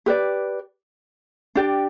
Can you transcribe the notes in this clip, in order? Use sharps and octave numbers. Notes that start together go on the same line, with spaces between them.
G4 B4 D5
D4 G4 D5